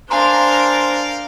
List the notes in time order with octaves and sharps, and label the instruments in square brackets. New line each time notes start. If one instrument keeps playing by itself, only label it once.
[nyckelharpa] D4 C5 [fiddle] A#4 F5 [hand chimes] G#5 A#5 C6